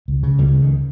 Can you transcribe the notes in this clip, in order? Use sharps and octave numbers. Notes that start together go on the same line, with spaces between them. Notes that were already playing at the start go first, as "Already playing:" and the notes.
C#2
C#3
C#2 G3
C#3
D#3